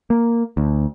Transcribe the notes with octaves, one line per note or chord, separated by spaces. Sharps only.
A#3
D2